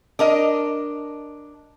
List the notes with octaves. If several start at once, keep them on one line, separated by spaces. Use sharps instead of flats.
D4 A#4 D#5